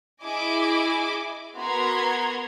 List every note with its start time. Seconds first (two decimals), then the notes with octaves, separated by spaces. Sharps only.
0.23 E4 G#4 D#5 G#5 D6
1.55 B3 F#4 A#4 A#5 C6 G#6